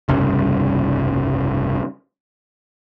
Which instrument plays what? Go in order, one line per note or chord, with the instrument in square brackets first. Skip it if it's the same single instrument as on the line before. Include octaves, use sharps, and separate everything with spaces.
[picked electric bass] F1 C2 G2 C#3